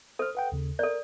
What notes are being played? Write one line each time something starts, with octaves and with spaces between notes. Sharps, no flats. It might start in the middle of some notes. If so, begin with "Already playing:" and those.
A4 C5 F6
B4 F#5 G5
D#2 C#3
A4 A#4 D5